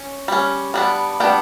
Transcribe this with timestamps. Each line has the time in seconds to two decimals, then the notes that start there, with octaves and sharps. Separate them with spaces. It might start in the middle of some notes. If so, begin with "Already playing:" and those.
Already playing: C#4
0.28 G3 C#4
0.74 G3 B3 D4
1.20 G3 B3 D4 G5